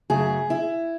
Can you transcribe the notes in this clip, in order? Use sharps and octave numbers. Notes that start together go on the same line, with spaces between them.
F#2 C#3 F#3 A3 G#4
E4